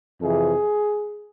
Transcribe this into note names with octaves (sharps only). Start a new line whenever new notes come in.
F2 C3 E3 G#4